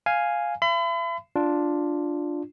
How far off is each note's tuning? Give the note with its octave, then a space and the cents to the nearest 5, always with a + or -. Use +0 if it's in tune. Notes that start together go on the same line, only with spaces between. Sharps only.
F5 +0 G#5 +0
E5 +40 B5 +40
D4 +0 F4 +0